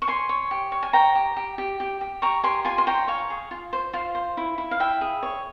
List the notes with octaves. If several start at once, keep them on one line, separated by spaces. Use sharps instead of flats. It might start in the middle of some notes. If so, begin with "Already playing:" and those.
C#6
C#5 G#5 C6
C#5
G4
C#5
G#5
C#5 G5 A#5
G4
G4
G4
G4
G4
G4 A#5 C#6
G4 G#5 C6
F4 G#5 C6
C6
C#5 G5 A#5
C#5 F5 G#5
G#4
F4
C5
F4 F5
C5
E4
E4
F5
E4 E5 G5
G#4
C#5